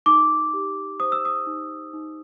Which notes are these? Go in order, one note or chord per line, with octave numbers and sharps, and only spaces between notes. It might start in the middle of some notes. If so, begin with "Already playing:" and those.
D#4 D6
G4
C5 D#6
E6
D#6
D#4
D#4